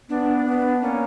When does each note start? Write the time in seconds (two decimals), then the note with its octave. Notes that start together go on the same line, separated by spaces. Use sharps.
0.09 B3 D4
0.45 B3
0.81 A#3 C#4